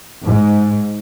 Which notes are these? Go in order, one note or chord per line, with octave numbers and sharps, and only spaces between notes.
G#2